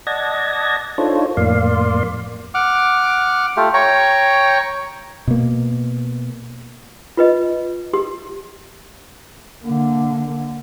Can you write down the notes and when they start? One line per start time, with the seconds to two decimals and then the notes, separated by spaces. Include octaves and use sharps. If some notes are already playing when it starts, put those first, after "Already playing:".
0.07 D5 D#5 F#5 A5 G#6 A#6
0.98 D4 D#4 F4 A4 C5 C#5
1.37 F2 A2 A#3 D5 F5 C6
2.54 F#5 D6 F6
3.57 A3 F4 G4
3.74 C#5 G5 A#5 C#6
5.27 B2 A#3
7.17 F4 B4 D#5
7.93 G4
9.64 D3 A#3